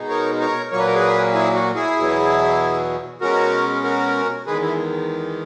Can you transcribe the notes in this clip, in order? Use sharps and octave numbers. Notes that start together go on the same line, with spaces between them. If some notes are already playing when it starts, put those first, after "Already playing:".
Already playing: B2 G#3 D#4
A#4 C#5
A#4 C#5
A#2 F#3 A#3 C#5
B4
A#4
G#4 B4
E4 G#4
F#4
E4 G#4
E2 B2 F#3
B2 G#3 C#4 F#4 A#4
F#4 A#4
E2 D#3 G#3 G#4 B4
E4 G#4